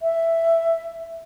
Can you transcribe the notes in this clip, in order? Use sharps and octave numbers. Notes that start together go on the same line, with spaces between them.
E5